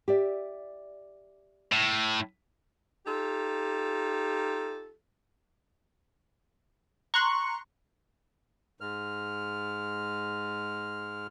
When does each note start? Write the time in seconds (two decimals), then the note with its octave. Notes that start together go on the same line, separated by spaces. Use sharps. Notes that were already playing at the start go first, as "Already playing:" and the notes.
0.08 G4 D5 E5
1.72 A2
3.06 D#4 F4 G4 A4
7.14 A#5 C6 C#6 F#6
8.81 G#2 G#3 F6